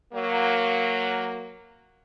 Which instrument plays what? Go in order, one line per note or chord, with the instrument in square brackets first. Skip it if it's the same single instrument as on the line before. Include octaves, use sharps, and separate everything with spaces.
[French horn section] F#3 A#3